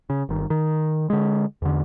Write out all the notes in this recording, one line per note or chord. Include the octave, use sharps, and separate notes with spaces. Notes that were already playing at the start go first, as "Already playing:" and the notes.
C#3
G1 D#3
D#3
D3 G#3
E2 D3